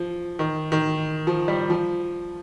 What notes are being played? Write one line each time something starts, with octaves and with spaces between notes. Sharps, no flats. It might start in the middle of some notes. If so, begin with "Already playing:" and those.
Already playing: F3
D#3
D#3
F3
G3
F3